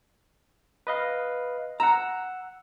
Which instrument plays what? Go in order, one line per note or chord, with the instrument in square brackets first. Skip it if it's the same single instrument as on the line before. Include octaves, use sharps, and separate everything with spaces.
[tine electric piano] B4 D#5 F5
[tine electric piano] F#5 E6 [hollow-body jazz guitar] A#5